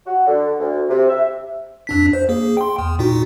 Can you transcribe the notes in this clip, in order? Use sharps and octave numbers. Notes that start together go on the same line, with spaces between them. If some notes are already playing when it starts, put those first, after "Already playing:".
F#4
D3
D2
C3
E5
F2 D4 B6
C5
A#3 G#4
G5 C6
E2
A#2 D#4 F#4